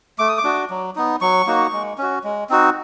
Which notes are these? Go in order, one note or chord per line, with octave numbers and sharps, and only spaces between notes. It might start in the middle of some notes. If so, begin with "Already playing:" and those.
A3 D6
D#6
D6
D4 F#4
F#3
B3 D#4
F#3 C#6
A#3 D#4 F#4
G#3
C#4 F#4
G#3
C4 D#4 F#4